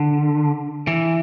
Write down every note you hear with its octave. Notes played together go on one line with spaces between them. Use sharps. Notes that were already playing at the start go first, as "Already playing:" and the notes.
Already playing: D3
E3